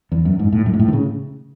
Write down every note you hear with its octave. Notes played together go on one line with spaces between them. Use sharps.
E2
F#2
G#2
A2
F#2
G#2
A2
D#3
C#3